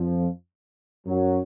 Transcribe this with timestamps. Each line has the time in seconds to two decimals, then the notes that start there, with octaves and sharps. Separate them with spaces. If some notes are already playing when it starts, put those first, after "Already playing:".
Already playing: F2 F3
1.07 F#2 F#3